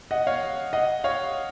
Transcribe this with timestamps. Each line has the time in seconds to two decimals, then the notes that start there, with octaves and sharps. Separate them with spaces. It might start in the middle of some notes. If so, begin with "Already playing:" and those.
0.11 D#5 F#5
0.27 C#5 F5
0.73 D#5 F#5
1.04 C#5 F5